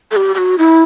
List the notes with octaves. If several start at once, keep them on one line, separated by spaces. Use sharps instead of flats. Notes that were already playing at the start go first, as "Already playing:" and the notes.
A4
G4
G4
F#4
E4